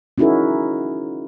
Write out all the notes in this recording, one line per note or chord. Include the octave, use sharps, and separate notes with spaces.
C#4 D#4 E4 F#4 G#4 A#4